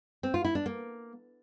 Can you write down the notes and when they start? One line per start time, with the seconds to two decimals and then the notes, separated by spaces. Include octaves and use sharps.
0.23 C4
0.34 F4
0.44 E4
0.55 D4
0.66 A#3